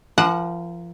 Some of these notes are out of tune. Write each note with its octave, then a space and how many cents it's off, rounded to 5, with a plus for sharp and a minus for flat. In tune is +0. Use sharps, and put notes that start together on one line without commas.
F3 -30 A#4 +0 F#5 +0